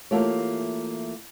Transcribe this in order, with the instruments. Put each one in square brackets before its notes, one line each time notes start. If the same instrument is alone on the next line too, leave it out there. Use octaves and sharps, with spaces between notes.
[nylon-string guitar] E3 A3 A#3 F4 G4 C#5